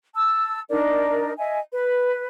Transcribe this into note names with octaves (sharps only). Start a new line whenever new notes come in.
A5 E6
D4 D#4 A#4 D5
D#5 E5 G#5
B4